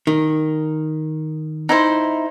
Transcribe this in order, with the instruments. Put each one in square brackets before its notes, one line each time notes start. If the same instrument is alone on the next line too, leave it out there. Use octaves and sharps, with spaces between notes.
[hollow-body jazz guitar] D#3
[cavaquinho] D#4 E4 C5